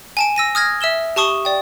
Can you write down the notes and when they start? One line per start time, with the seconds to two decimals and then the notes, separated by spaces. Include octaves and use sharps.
0.17 G#5 A5 D7
0.36 E6 A#6 D#7
0.55 D#6 F6 G#6 A#6
0.81 E5 E6 E7 G7
1.16 G4 A5 C#6 D#6 G7
1.45 D5 G5